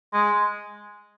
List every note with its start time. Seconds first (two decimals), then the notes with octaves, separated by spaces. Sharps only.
0.13 G#3